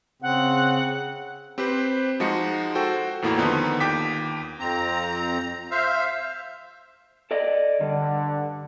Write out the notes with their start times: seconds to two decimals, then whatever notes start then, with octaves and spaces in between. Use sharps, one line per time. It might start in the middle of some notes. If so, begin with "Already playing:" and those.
0.22 C#3 C4 F#5
1.58 C4 G4 B4 C5
2.20 F3 G#3 D#4 F#4 C#7
2.75 F#4 A4 C5 G5
3.22 E2 A2 A#3 E4 F#4 A#5
3.38 D3 D#3 F3 B3 D#4 F4
3.80 D#2 G5 D6 B6
4.59 F2 C4 A#5
5.71 C5 E5 F5
7.31 A4 D5 D#5
7.81 G2 D3